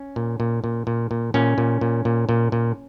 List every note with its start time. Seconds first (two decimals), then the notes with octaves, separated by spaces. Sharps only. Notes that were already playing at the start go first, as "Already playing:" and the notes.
Already playing: C#4
0.16 A#2
0.40 A#2
0.64 A#2
0.87 A#2
1.11 A#2
1.34 A#2 C#4
1.58 A#2
1.81 A#2
2.05 A#2
2.29 A#2
2.52 A#2